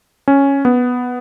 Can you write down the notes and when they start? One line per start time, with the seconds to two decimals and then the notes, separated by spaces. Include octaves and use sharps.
0.28 C#4
0.65 B3